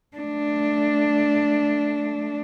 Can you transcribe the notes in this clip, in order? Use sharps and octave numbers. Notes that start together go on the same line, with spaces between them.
A3 D4